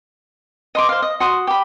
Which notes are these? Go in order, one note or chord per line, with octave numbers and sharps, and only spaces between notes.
D#5 C6 D6
C5 F5
D#5
F#4 C6 D#6
G4 B5